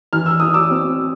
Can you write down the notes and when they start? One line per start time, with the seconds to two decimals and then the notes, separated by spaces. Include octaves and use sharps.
0.13 E3 F6
0.26 E6
0.40 E3 D#6
0.54 D6 E6
0.71 C4